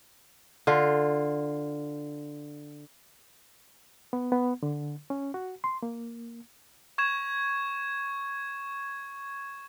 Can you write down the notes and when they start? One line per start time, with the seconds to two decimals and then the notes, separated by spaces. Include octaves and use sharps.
0.67 D3 F4
4.13 B3
4.32 B3
4.63 D3
5.10 C#4
5.34 F#4
5.64 C6
5.83 A#3
6.98 C#6 G#6 E7